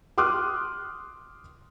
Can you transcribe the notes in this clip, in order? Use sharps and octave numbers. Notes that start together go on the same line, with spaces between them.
C6 D6 D#6 F6 F#6